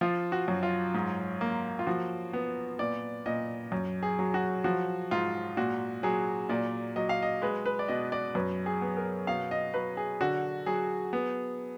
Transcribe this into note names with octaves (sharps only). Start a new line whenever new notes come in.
F3 F4
F#4
F#2
F4
G#2
A#3
F4
F3 F#4
B3
A#2 D5
A#2 D#5
F#2
G#4
F#3
F#4
F3 F#4
G#2 F4
A#2 F#4
F#3 G#4
A#2 D5
F#3 D#5
F5
D#5
G#3 B4
B4
D5
B2 D#5
D5
F#2 B4
G#4
B3
A#4
B2 F5
D#5
F#3 B4
G#4
D3 F#4
F#3 G#4
B3